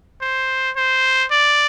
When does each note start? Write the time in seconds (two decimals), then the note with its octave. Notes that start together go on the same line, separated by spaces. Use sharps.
0.22 C5
0.76 C5
1.31 D5